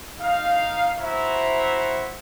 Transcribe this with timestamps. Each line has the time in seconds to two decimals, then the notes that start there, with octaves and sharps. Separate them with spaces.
0.19 D#4 F5
0.98 E4 F#4 C5 E5 A#5